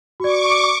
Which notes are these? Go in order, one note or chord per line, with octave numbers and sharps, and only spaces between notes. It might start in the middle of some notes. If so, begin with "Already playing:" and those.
F#4 D5 C#6 D6